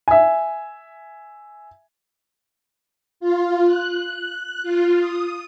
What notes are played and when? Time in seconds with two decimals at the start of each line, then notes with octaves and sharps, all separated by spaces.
0.08 E5 G#5
3.20 F4
3.66 F#6
4.63 F4
4.99 D#6